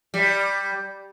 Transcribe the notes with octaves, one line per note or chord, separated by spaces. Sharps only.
G3